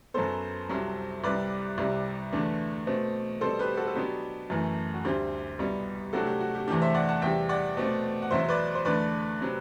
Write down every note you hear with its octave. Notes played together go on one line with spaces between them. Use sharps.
F#2 F#3 B3 A4 C5
C2 C3 F#3
C2 C3 G3 B4 D5
C2 C3 G3
E2 D3 A3 D4
B2 A3 C4
B2 G3 C4 A4 C5
G4 B4
F#4 A4
A4
B2 F#3 B3 D4 G4
F#2 E3 A3
F#4
D2 D3 G3 C4 G4
C2 B2 G3 B3
C3 F#3 A3 D4 F#4 A4
G4
F#4
G4
E2 C3 E3 A3 D4 G4
C5 E5
D5 F#5
F#5 A5
E2 C3 G3 E5 G5
D5 F#5
B2 A3 C4
F#5
E2 B2 F#3 C5 E5
B4 D5
C5
E2 D3 A3 B4 D5
C3 F#3 C4